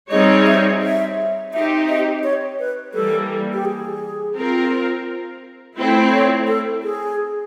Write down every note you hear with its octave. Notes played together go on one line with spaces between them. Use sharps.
G3 C4 D#4 G#4 C#5 D#5
E5
E5
C4 D#4 G4 E5
D#5
C#5
B4
E3 G3 A#3 A4
G4
G#4
C4 F4 A#4
A3 C4 E4
C#5
A4
G#4